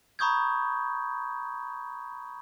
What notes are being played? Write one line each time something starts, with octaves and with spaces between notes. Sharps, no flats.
A#5 B5 C#6 D#6 G6 G#6